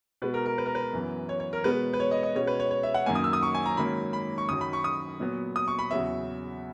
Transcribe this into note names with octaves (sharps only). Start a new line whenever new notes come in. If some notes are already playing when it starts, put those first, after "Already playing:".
B2 G#3 B3 B4
A#4
A#4
B4
A#4
B4
F#2 E3 B3
C#5
C#5
A#4
B2 G#3 B3 B4
B4
C#5
D#5
D#5
B2 G#3 C#4 C#5
B4
C#5
C#5
E5
F#5
F#2 D#3 A#3 C#4 G#5
D#6
E6
D#6
C#6
G#5
A#5
G#2 D#3 F#3 A#3 C#4 B5
B5
C#6
F#2 D#3 F#3 D#6
B5
C#6
D#6
A#2 F#3 B3
D#6
C#6
B5
E2 C#3 F#3 B3 E5